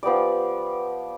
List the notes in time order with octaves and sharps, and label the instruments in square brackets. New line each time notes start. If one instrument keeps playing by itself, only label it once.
[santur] F3 B3 G4 D5